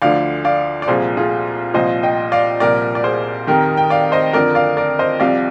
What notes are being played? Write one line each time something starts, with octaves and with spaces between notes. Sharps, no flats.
D2 D3 F3 D5 F5
D5 F5
D5
C2 A#2 F3 G#4 C5
F4 G#4
C2 A#2 F3 C5 D#5
D#5 G5
D5 F5
C2 A#2 F3 A#4 D5
D5
G#4 C5
F2 D#3 G4 A#4
G5
D5 F5
C5 D#5
F2 D3 F3 A#4 D5
D5 F5
A#4 D5
C5 D#5
C2 C3 F3 D5 F5